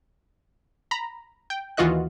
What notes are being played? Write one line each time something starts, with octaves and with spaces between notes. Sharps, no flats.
A#5 B5
G5
D#2 E3 F4 F#4 D#5 F#6